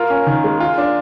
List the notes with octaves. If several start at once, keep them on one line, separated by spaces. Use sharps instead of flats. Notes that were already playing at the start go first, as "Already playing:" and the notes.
Already playing: F4 A#4
C#4
D#3
G#3
F4
D4